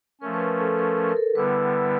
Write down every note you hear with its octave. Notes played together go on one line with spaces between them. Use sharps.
F3 A3 C#4 A#4
B4
A#4
A4
A#4
A#4
A#4
A4
D3 G3 B3 E4 B4